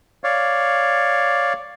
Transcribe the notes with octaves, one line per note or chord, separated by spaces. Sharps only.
C#5 D5 F5